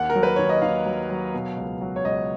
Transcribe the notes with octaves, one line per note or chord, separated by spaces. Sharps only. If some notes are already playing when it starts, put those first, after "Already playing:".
Already playing: D#2 F#5
A#4
F#3
B4
D#2 C#5
D#5
D#2 F5
F#3
F#3
B2
C#2
F#3
C#5
C#2 D#5